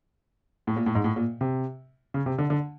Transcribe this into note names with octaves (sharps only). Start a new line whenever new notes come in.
A2
A#2
A2
G#2
A2
A#2
C3
C#3
C3
D3
D3